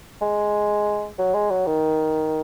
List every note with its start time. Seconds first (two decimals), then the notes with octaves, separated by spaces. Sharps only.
0.22 G#3
1.19 F#3
1.34 G#3
1.51 F#3
1.66 D#3